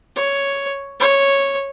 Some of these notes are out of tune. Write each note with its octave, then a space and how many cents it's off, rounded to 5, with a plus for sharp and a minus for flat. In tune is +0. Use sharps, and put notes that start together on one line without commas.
C#5 +5
C#5 -5